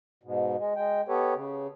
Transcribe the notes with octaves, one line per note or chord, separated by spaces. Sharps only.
G#2 B2
G#3
G#3 G5
B3 G4 A4 B4 C#5
C#3